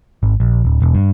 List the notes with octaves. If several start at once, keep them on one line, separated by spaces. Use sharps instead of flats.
G#1
A#1
D1
E1
G2